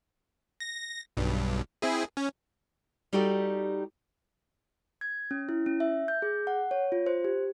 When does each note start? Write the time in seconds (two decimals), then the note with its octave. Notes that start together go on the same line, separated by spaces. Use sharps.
0.60 A#6
1.17 B1 G2
1.82 C4 E4 G#4
2.17 C#4
3.13 G3 D#4 F#4 G4 A4 D5
5.01 G#6
5.31 C#4
5.49 E4
5.66 C#4
5.80 E5
6.08 G6
6.22 G#4
6.47 F#5
6.71 C#5
6.92 F4
7.06 C5
7.24 G4